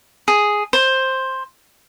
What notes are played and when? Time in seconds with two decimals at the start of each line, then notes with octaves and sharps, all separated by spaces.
0.28 G#4
0.73 C5